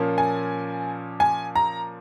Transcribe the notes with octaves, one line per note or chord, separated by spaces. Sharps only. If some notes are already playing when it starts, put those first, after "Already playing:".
Already playing: A#2 F3 A#3 C#4
G#5
G#5
A#5